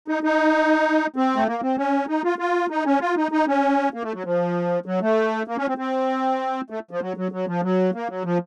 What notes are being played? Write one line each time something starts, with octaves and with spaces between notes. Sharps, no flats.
D#4
D#4
C4
A3
A#3
C4
C#4
D#4
F4
F4
D#4
C#4
F4
D#4
D#4
C#4
A#3
A3
F#3
F3
F#3
A3
A#3
C#4
C4
C4
A3
F3
F#3
F#3
F#3
F3
F#3
A#3
F#3
F3